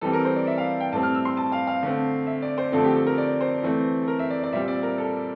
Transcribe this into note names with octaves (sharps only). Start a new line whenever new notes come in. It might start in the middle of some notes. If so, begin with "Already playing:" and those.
E3 G3 C4 A4
A#4
C5
D5
E5
F5
G5
A2 G3 C4 A5
F6
E6
C6
A5
F5
F5
D3 A3 C4
E5
D5
C5
D3 F3 A3 C4 A4
G4
A4
A#4
D5
C5
E3 A3 C4
A4
A#4
E5
D5
D5
A#2 G3 C4 E5
D5
A#4
A4